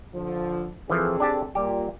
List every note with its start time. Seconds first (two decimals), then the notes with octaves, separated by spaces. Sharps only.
0.15 D3 F3
0.90 E3 F3 C4 G#4 A4
1.20 D4 G4 A5
1.55 A#2 G3 G4